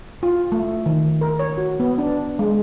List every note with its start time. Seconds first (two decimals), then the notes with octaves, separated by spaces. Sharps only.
0.23 F4
0.52 A3
0.86 D#3
1.21 A#4
1.39 C#5
1.58 F#4
1.80 B3
1.98 D4
2.39 G#3